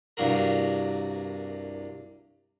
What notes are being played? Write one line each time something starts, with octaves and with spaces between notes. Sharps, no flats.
C2 G2 A#3 F#4 A#4